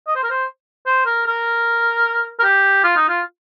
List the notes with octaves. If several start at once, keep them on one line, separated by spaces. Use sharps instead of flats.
D#5
C5
A#4
C5
C5
A#4
A#4
A#4
G4
F4
D#4
F4